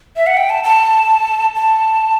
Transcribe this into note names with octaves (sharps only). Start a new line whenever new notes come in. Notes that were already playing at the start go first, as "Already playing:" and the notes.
E5
F#5
G5
A5
A5
A5